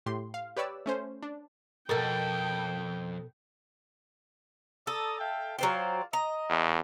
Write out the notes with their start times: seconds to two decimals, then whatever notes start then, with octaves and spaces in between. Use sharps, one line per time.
0.06 A2 G4 C6
0.34 F5
0.56 G4 B4 C#5 D5 E6
0.86 A3 C#4 C5
1.23 D4
1.89 F2 B2 A4 A#4 G5
4.87 A4 D5 A#5 D#6
5.19 E5 F5 G5
5.58 F#3 F4 C5 D5 F5 G5
6.13 D#5 A#5
6.49 E2